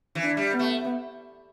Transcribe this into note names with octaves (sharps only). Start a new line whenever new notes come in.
E3
D4
G3
B3
A3